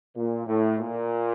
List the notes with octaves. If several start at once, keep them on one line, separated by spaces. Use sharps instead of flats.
A#2
A2
A#2